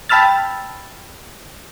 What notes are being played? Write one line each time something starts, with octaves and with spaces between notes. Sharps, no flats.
G5 A5 B5 E6 F6 A6